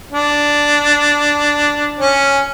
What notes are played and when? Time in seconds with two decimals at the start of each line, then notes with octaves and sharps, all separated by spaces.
0.12 D4
1.99 C#4